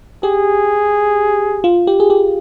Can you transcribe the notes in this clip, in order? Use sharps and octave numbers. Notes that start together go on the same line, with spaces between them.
G4 G#4
F4
G4
G#4
G4